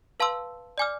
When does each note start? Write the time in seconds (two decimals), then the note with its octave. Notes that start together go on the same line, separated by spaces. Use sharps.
0.20 B4 F5 A5 C6 E6
0.78 D5 G#5 D6 F6